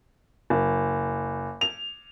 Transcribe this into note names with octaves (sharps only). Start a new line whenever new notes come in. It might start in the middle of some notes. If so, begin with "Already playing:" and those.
F#1
F7